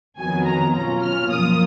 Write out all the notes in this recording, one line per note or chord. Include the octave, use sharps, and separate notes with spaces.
F2 D#3 F#3 B3 G#5
A#5
B2 F#3 C#4 F4 A#5
F6
F#2 F3 A#3 F4 D#6